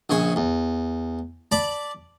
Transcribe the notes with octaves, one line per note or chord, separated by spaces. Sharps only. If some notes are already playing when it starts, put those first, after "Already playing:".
A#1 C#3 G#5 C#6
E2
D5 A5 B5 D6